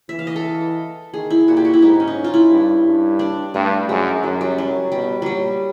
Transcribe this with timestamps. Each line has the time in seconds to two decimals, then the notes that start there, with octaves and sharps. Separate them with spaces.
0.09 E3 E5
0.19 F5
0.27 D#5
0.36 A4
1.13 D#3 G#4
1.30 E4
1.48 A#2 F#4
1.57 G4
1.65 F#4
1.74 E4
1.81 G#2 D#4
2.00 C#4
2.08 D#4
2.24 F4
2.34 E4
2.50 G2
2.86 G2
3.19 D4
3.54 G2 A3
3.88 F#2 G#3
4.23 F#2 F#3
4.41 G3
4.58 F#3
4.92 B2 G3
5.22 A#2 F#3 G3